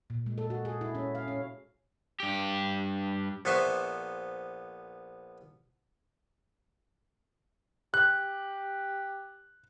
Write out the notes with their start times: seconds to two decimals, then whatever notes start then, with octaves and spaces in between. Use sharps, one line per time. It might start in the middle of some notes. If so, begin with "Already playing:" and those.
0.10 A#2
0.26 G#3
0.38 A4
0.50 F#4
0.65 G#4
0.81 E4
0.95 C#4
1.15 F5
1.28 C#4
2.20 G2 G4
3.45 A#1 B3 C5 E5 C#6
7.94 G4 F#6